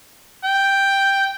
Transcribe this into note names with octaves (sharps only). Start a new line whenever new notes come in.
G5